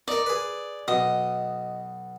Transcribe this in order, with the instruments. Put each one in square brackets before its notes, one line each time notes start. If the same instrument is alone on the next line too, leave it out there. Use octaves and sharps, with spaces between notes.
[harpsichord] D#4 A#4 [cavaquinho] D5
[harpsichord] G#4 B4
[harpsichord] B1 B2 [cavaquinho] D#5